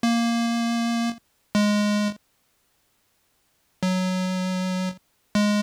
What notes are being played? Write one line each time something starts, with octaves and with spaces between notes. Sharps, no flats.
A#3
G#3
F#3
G#3